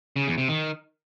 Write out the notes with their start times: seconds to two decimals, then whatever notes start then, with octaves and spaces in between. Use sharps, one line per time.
0.16 C#3
0.27 E2
0.38 C3
0.49 D#3